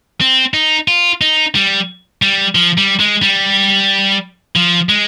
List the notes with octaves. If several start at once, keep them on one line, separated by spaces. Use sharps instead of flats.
C4
D#4
F4
D#4
G3
G3
F3
G3
G#3
G3
F3
G#3